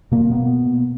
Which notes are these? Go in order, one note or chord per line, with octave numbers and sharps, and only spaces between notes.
B2 A#3
B3